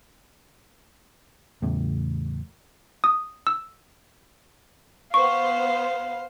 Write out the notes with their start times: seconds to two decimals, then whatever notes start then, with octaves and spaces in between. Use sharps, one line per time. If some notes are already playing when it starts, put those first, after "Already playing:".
1.62 E2 A2 C#3
3.04 D#6
3.47 E6
5.14 B3 C5 F5 C#6